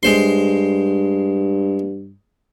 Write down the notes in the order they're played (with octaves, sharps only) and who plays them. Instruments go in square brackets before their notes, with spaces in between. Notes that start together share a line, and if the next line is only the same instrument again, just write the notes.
[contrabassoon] G2 [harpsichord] G#3 C5 C6